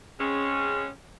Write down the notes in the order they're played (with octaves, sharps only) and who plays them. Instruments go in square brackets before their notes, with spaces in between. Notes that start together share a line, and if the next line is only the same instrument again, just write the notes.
[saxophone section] C#3 G#3 C4 C#4